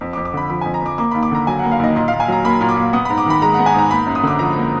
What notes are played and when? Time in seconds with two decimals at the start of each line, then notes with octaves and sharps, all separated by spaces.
0.01 F2
0.13 D6
0.17 F2
0.25 D6
0.34 D3 B5
0.50 F3 B5
0.61 G#5
0.66 F2
0.74 A#5
0.82 F2 D6
0.98 A#3 D6
1.11 D#2 B5
1.23 D6
1.31 D3 A#5
1.47 F#3 G#5
1.59 F#5
1.64 A#3
1.72 F5
1.79 D#2 D#5
1.96 A#2 D#5
2.08 F5
2.12 A#2
2.20 G#5
2.28 F#3 A#5
2.45 A#3 B5
2.61 A#2
2.69 D6
2.77 A#2
2.93 B3 D#6
3.05 B5
3.10 G#2
3.18 D6
3.26 D#3 B5
3.42 G#3 A#5
3.54 F#5
3.59 B3
3.66 G#5
3.74 G#2 A#5
3.91 A#3 B5
4.07 F#2
4.15 D#6
4.23 D3 D6
4.39 F3 A#5
4.56 A#3